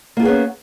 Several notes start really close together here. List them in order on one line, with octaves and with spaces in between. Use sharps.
A#3 F4 G#4 B3 C#4